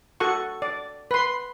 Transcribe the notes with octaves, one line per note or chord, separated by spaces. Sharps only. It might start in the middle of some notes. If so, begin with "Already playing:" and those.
F#4 A4 F#5 C#6
D5
B4 C6